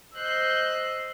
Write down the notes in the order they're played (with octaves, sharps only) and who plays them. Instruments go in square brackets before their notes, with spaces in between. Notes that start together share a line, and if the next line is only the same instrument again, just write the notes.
[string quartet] C5 D#5 C6 E6 F#6 G6